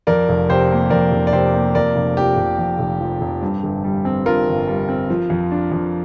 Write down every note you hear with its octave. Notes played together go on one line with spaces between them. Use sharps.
F2 A#4 D5
F1
C3 G4 C5
A#3
F2 A#4 D5
F1
D5
C3 G4 C5
A#3
F2 A#4 D5
F1
F3 G4
F1
F2
F1
F3
F1
G2
G1
G3
C4
G2 F4 A#4
G1
G3
C4
F3
F2
D4
F2